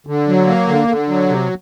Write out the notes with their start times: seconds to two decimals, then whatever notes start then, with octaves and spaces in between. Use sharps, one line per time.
0.07 D3
0.28 F#3
0.47 A#3
0.68 D3
0.88 D3
1.08 F#3
1.29 C3